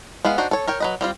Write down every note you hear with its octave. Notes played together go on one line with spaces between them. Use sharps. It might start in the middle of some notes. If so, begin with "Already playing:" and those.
G#3 B3 E4 F5
D4 D#4 F#4 C5
A4 C#5
A#4 C#5 G5
F#3 B4 D#5
G3 C4 F4